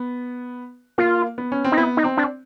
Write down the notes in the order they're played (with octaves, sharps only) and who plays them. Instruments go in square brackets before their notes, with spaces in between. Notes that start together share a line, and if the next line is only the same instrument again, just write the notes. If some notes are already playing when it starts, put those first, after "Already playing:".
Already playing: [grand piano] B3
[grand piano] A#3 [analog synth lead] F4
[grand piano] B3
C#4
C4
[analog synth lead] D#4
[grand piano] B3 [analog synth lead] E4
[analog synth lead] D#4
[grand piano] C4
[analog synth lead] D4